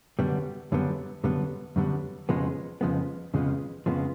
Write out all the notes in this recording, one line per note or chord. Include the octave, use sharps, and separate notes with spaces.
F#2 D3 G3 B3
F#2 D3 G3 B3
F#2 D3 G3 B3
F#2 D3 G3 B3
F2 C#3 F3 G#3 B3
F2 C#3 F3 G#3 B3
F2 C#3 F3 G#3 B3
F2 C#3 F3 G#3 B3